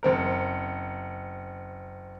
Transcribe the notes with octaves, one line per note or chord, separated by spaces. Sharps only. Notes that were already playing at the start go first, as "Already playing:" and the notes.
F#1 C4 A#4